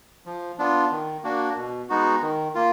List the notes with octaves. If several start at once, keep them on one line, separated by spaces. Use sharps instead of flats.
F3
B3 D4 F4
D#3
A#3 D4 F#4
B2
G#3 B3 D#4 F#4
D#3
A#3 F4